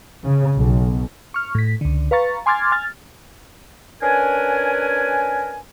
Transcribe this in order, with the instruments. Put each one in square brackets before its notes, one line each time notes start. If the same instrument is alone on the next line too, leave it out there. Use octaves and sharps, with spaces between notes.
[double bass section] C#3
B1
[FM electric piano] C#6 F6
A2 B6
C#2 D3
B4 F5 A#5 C#6 A6
G#5 C6 D6 F6 G#6 A6
G#5 F6 A6
[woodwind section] C#4 D4 A#4 B4 G#5